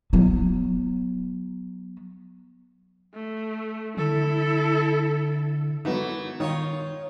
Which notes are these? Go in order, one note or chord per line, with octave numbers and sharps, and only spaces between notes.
F#3 B3
A3
D3 E4 A4
F#2 E3 F#3 A3 B3 D#4
D#3 D#4 F4 C#5